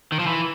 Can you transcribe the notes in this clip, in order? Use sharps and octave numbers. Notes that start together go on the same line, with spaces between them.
D#3
F3
E3